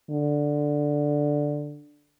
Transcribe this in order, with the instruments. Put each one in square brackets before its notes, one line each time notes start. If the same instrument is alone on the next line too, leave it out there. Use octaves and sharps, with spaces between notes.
[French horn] D3